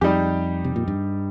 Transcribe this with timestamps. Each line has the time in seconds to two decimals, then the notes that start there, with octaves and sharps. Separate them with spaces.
0.01 F2 G3 D#4 G4
0.64 C3
0.76 A#2
0.88 G2